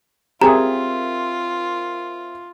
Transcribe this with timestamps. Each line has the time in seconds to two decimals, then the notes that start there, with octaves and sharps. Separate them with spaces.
0.42 C4 F4 G4 G#4 A#4 E5 A#5